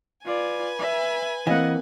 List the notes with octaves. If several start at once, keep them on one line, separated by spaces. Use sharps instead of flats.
F4 B4 D5 G#5
E5
E3 A#3 C4 D#5 F5 F#5